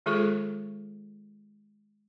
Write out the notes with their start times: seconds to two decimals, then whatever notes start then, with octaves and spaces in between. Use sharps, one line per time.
0.06 D#3 G#3 F4 G#4 A4 C#6